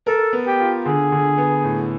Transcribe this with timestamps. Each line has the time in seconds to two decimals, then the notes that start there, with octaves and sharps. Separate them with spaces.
0.07 A4 A#4
0.33 B3
0.47 G4
0.60 F4
0.86 D3 G#4
1.12 D3
1.38 B3
1.64 A2